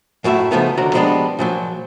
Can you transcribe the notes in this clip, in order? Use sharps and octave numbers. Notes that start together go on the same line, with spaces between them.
F#2 A2 F#4 G4 E5
C#3 E3 F3 A3 B3 D#4
D#2 D3 F#4 A#5
F3 G3 G#3 B3 D4
A#2 F3 F#3